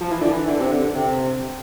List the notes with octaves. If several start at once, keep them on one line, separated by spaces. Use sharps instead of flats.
F3
E3
D3
E3
D3
C3
D3
C3